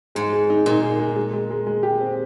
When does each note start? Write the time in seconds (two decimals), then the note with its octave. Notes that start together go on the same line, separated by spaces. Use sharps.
0.15 G#2 G#3
0.33 G#3
0.50 D#4
0.66 A#2 D#4
0.82 G#4
0.99 G#3
1.16 G#3
1.33 G#3
1.51 G#3
1.67 G#3
1.83 G4
2.00 C4